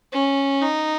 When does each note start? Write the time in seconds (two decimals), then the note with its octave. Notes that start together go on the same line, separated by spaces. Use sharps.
0.13 C#4
0.62 D#4